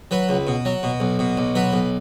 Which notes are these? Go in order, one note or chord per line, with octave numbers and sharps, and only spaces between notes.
F#3 B4
C#2
B2
F#3
B2
B1
B2
B1
F#3 B4
B1